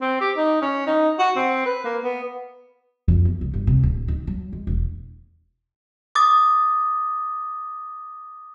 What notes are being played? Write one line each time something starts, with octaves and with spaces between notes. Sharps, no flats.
C4
G4
D#4
C#4
D#4
F#4
C4
B4
A#3
B3
F2
B3
C2
G1
C3
D1
D#3
F#3
G#3
E1
D6 D#6 A6